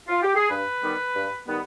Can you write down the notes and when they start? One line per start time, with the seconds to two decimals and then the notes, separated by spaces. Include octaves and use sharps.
0.08 F4
0.23 G4
0.36 G#4
0.50 G2 B4
0.82 D#3 G3 B3
1.15 G2
1.47 D#3 G3 B3